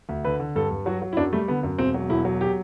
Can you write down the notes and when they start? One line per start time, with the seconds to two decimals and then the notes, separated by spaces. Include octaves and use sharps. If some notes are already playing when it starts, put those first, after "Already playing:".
0.09 D2
0.24 D3 B4
0.40 D3
0.56 G2 A4
0.71 G2
0.86 F#3 F#4
1.02 F#3
1.13 E4
1.17 F#2 D4
1.32 G3 A3
1.48 D3 B3
1.63 F#2
1.78 E1 C4
1.94 F#3
2.10 E1 E4
2.25 F#3
2.41 G4